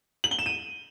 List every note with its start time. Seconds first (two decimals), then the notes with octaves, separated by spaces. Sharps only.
0.24 F#7
0.31 G7
0.39 E7
0.46 D#7